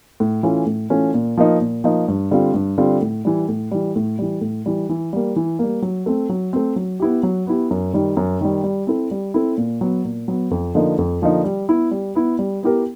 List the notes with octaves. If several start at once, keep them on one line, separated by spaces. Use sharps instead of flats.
A2
E3 A3 C#4 F4
A2
E3 A3 C#4 F4
A#2
F3 A#3 D#4
A#2
F3 A#3 D#4
G2
D3 G3 C4 F4
G2
D3 G3 C4 F4
A2
E3 G3
A2
E3 G3
A2
E3 G3
A2
E3 G3
E3
G3 A#3
E3
G3 A#3
F#3
A3 C4
F#3
A3 C4
F#3
B3 E4 G4
F#3
B3 E4 G4
F#2
D#3 G3
F#2
D#3 G3
G3
C4 E4 A4
G3
C4 E4 A4
A#2
F#3 B3
A#2
F#3 B3
F2
D3 F3 A#3 D#4
F2
D3 F3 A#3 D#4
G3
B3 E4
G3
B3 E4
G3
B3 E4 G4 A#4